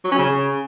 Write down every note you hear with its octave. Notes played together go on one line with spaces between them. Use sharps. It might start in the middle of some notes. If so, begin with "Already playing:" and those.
F#3
C#4
C#3